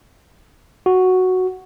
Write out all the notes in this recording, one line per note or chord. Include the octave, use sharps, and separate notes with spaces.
F#4